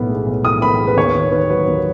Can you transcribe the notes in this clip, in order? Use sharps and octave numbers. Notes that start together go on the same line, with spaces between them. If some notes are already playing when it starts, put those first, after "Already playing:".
Already playing: B1 A2 B3
G#3
B1
A2 D#6
B3 B5
G#3
B4
D#2 C#5
D#3
D#2 B4
F#3 B4
D#2